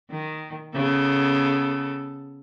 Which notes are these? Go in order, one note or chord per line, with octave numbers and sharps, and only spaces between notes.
D#3
C#3 B3 A4